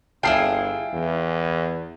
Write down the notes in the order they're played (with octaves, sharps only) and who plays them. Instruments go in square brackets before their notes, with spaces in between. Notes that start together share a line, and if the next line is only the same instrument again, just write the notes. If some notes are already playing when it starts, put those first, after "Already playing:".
[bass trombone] G1 [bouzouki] E4 G#4 F5 [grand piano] G5 A5 C7
[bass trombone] E2